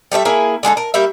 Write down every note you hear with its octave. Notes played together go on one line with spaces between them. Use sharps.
G3 A3 A#4 E5
A#3 E4 G#4
D3 G#3 F4 A4
A#4
G3 A#3 E5